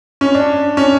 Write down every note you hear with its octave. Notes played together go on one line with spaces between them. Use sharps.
C#4
D4
C#4